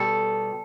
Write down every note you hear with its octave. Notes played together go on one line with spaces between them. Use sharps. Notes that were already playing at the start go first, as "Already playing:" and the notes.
Already playing: B2 G3 A4